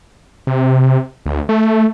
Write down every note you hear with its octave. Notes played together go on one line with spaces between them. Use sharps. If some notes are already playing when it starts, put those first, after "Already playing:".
C3
D2
A3